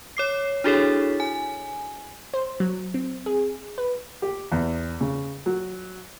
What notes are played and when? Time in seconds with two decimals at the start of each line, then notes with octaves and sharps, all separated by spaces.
0.17 C#5 D6 C7
0.64 D4 E4 F#4 G#4 A4 C#5
1.20 G#5
2.34 C5
2.60 F#3
2.94 C4
3.26 G#4
3.78 B4
4.22 G4
4.52 E2
5.01 C#3
5.46 F#3